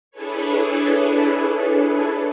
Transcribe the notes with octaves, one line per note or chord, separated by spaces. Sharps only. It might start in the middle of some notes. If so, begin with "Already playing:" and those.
D4 E4 G#4 A4 B4 C#5